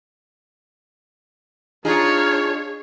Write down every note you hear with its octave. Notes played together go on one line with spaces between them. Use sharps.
D4 D#4 F4 G#4 C#5